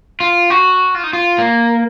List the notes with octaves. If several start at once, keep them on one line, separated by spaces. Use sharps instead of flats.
F4
F#4
F4
D#4
F4
A#3